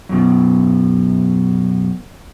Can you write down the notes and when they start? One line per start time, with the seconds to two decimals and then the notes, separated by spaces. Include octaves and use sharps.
0.09 F#2 B2